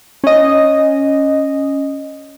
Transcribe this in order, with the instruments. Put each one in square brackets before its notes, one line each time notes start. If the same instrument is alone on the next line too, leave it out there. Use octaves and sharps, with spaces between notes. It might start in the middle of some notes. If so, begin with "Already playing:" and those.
[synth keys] C#4 D#5